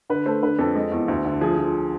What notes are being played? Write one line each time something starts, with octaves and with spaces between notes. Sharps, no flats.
D3 B4
A3 C5
D3 B4
F2 A4
G#3
E2
D2
D3
F3 G#4
F3